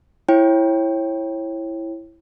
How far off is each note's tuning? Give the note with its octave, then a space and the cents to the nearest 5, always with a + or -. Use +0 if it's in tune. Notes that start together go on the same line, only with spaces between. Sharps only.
E4 +5 C#5 -30 G5 +0